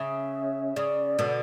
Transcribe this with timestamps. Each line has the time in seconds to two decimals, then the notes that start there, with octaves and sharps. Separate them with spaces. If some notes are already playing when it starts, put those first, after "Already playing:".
Already playing: C#3 E5
0.76 C#3 D5
1.19 B2 D3